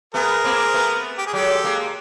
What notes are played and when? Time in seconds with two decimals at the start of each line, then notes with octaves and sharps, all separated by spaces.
0.14 A3 B3 G#4 A#4
0.44 A#3 C4
0.74 A3 B3
1.18 G4
1.27 G#4
1.33 F#3 G#3 G4 A4
1.64 G#3 A#3